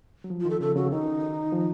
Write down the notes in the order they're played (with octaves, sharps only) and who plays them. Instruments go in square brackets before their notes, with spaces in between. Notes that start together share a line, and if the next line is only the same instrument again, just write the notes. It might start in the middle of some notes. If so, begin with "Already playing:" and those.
[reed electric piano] F#3
F3
[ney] F4
[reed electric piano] D#3
[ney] A4
[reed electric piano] C#3 [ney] A4
[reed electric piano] C#3 [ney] F#4
[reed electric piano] D#3 [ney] D#4
[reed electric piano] F3